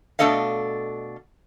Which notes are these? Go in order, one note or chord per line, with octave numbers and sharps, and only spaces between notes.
B2 A3 D4 A4 D#5 F5